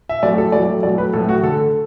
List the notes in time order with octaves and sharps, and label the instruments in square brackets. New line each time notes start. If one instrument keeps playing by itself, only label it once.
[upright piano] E5
A2 F#3 A3 D5
A4
A2 F#3 A3 D5
A2 F#3 A3 D5
B4
A2 F#3 A3 A4
F#4
D3 A3 A4